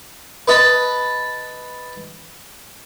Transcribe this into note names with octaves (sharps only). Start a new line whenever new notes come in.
B4 D#5 A5 B5